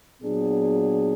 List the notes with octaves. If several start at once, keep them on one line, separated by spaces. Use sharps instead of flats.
A#2 F#3 B3 D4 G#4